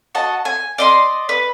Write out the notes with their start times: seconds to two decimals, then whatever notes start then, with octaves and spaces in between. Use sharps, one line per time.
0.15 F#4 D#5 A5
0.45 G#5
0.78 D5 D#5 C6
1.29 B4